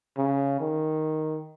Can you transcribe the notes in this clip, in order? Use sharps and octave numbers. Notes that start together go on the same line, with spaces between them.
C#3
D#3